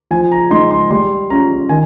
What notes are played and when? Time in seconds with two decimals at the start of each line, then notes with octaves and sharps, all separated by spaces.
0.11 F3 G#5
0.32 A#5
0.51 G#3 D#4 C6
0.71 C6
0.90 G3 C6
1.30 C#4 F4 A#5
1.69 D#3 G#5